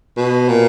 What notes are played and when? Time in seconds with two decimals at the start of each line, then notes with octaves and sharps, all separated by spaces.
0.17 B2
0.49 A#2